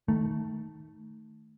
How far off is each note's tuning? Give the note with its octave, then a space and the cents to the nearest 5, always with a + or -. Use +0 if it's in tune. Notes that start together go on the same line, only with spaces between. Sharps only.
D#3 +10 A3 +0